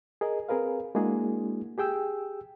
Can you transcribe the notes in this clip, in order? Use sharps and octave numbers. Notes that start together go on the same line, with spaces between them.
G#4 A#4 D#5
C4 G#4 A#4 B4 F5
G#3 A#3 D4 E4 F#4 G#4
G4 G#4 G5 E6